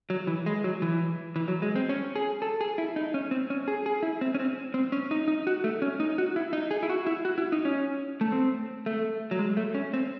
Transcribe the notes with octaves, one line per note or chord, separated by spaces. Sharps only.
F#3
E3
G#3
F#3
E3
E3
F#3
G#3
C4
C#4
G#4
A4
G#4
E4
D#4
C#4
C4
C#4
G#4
G#4
E4
C4
C#4
C4
C4
C#4
D#4
D#4
F#4
A3
C#4
D#4
F#4
E4
D#4
G#4
E4
F#4
E4
F#4
E4
D#4
C#4
A3
C4
A3
F#3
G#3
A3
C#4
C4